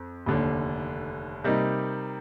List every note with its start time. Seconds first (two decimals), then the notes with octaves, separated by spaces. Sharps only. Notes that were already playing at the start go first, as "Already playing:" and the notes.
Already playing: F2
0.26 F1 D#2 D3
1.44 C3 G3 A#3 D#4